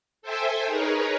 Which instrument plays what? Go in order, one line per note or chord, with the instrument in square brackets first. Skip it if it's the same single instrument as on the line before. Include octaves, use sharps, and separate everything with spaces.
[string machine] A4 C5 E5 G5 G#5
D#4 G#4 A#4 B4 C#5